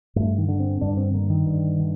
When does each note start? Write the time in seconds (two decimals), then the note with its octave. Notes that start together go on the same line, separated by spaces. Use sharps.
0.16 G2 A3
0.38 D#3
0.48 D3
0.60 C4
0.81 G2 D4
0.97 C4
1.14 D3 A#3
1.30 D#3
1.46 G2
1.80 D3